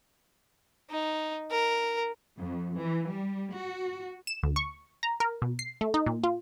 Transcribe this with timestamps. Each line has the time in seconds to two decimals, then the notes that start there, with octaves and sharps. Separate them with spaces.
0.90 D#4
1.50 A#4
2.38 F2
2.80 E3
3.11 G3
3.56 F#4
4.27 E7
4.43 D2
4.56 C#6
5.03 A#5
5.20 A#4
5.42 B2
5.59 C7
5.81 A3
5.94 D#4
6.06 A#2
6.24 F4